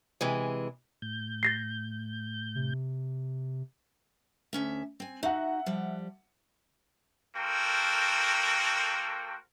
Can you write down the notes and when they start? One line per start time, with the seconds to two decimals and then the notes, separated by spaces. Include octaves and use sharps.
0.21 C3 E3 G#3
1.02 A2 G6
1.43 A6 A#6 C7
2.55 C3
4.53 D2 C#4 E5
5.00 C4 G#5
5.23 D#4 F#4 E5 F#5
5.66 F3 G3
7.36 A#3 F#4 A4 A#4 C5 G5